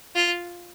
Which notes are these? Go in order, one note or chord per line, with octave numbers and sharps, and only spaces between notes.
F4